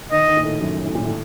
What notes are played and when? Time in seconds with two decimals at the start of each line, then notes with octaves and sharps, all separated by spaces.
0.12 D#3 D#5
0.28 D#3
0.37 A#2
0.44 A2
0.61 F#2
0.85 A2
0.95 A#2
1.05 A2